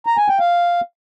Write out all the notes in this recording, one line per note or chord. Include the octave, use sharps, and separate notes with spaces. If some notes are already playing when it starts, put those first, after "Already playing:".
A#5
G#5
G5
F5